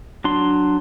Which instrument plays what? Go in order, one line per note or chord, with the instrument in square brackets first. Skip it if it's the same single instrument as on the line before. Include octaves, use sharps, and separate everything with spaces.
[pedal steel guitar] F#3 D4 C6